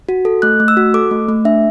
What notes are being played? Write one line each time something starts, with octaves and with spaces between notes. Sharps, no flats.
F#4
A4
A3 F#6
A3
E6
F#4
A4 D6
A3
A3
D4 E5